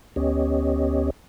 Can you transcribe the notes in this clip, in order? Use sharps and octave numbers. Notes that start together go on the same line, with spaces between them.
D2 B3 C#4 G4 C#5 D#5